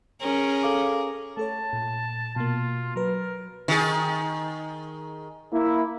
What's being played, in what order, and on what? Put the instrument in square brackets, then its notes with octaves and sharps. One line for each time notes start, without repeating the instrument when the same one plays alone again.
[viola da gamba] C#4 [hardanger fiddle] G#4 A#4
[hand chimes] A4 F5 D6
[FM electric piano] A3 A4 C#5 [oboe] A5
[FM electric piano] A#2
[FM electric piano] B2 A#3 [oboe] F4
[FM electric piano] F#3 B4 [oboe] A#4
[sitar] D#3 G#4
[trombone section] A#3 E4